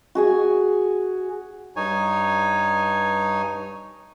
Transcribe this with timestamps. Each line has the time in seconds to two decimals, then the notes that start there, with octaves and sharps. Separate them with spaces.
0.15 F#4 G#4 G#5
1.76 G2 D#4 C#5 G#5